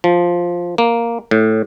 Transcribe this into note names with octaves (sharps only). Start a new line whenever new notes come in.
F3
A#3
A2